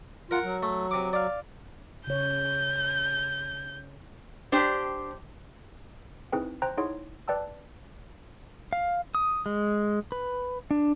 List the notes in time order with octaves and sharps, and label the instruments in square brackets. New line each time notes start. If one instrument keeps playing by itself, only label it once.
[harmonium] F4 [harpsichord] A#4 F#5
[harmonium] F#3
[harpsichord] A3
C3 D6
D5 F5
[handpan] C#3 C#5 [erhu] G6
[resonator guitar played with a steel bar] D4 G4 C5 G5
[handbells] C4 D#4 E4 G#4 B4 G5
C5 G5 A#5 F#6
D#4 E4 G#4 C#5 F#5 C6
B4 D5 G5 A5 E6
[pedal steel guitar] F5
D#6
G#3
B4
D4